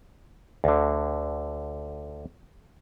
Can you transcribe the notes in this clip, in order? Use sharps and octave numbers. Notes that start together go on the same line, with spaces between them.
D2 D3